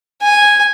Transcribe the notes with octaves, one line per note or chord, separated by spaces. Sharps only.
G#5